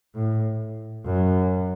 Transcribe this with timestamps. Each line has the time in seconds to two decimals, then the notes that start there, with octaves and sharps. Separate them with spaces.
0.15 A2
1.05 F#2